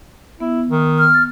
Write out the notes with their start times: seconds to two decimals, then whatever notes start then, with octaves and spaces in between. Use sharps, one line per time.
0.40 B3 E4
0.69 D#3
0.99 F6
1.14 A6